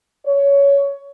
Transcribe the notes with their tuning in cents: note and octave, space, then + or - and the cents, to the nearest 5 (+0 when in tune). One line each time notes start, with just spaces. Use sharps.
C#5 +15